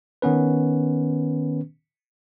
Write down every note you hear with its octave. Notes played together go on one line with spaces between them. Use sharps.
D#3 B3 C#4 B4